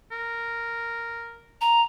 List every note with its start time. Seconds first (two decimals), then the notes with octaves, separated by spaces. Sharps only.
0.12 A#4
1.61 A#5